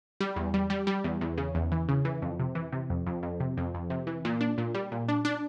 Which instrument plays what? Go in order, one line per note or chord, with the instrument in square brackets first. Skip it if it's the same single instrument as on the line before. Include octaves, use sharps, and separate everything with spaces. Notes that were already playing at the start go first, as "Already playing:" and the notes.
[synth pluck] G3
E2
G3
G3
G3
E2
E2
C#3
E2
E3
C#3
E3
F2
C3
E3
C3
F2
F2
F2
C3
F2
F2
C3
E3
A#2
D4
A#2
G3
A#2
D4
D4